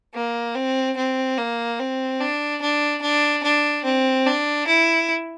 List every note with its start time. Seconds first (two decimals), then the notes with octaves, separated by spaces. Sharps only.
0.14 A#3
0.55 C4
0.97 C4
1.38 A#3
1.79 C4
2.21 D4
2.62 D4
3.02 D4
3.44 D4
3.85 C4
4.27 D4
4.67 E4